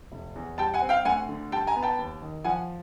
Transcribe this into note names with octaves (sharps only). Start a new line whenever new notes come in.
F1
E2
G3 G5 A5
F#5 G#5
C4
F5 G5
D2 F#5 G#5
D3
G3 G5 A5
G#5 A#5
B3
G5 A5
D#2
D#3
F3 F#5 G#5